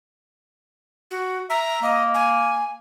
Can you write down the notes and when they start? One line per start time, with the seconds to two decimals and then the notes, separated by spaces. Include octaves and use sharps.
1.11 F#4
1.50 E5 A#5
1.83 A#3 D#5
2.14 G#5